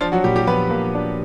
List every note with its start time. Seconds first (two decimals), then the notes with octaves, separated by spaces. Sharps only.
0.01 F3 D4 F4
0.12 F#3 F#4
0.24 A#2 G3 G4
0.36 G3 G4
0.47 F3 B3 B4
0.71 A#3
0.95 D4